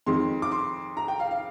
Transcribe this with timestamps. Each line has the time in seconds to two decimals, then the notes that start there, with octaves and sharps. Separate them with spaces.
0.06 F2 D#3 G#3 C6
0.42 D6
0.52 C6
0.97 A#5
1.08 G5
1.20 F5
1.31 F5